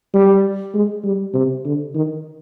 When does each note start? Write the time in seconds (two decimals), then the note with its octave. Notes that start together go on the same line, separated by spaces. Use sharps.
0.14 G3
0.74 G#3
1.04 G3
1.34 C3
1.65 D3
1.95 D#3